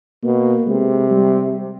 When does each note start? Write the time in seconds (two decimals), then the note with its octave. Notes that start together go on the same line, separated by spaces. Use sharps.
0.23 B2 A#3
0.67 C3 G#3
1.10 G3